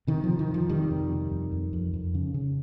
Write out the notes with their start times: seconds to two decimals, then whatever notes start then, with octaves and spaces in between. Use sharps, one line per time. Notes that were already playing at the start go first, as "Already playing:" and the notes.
0.07 C3 D#3
0.24 F3
0.29 C3
0.39 D#3
0.49 F2 F3
0.69 C3 D#3 G3
0.90 F2
1.11 C3
1.32 F2
1.52 F2
1.73 F2
1.94 F2
2.15 C#3
2.34 C#3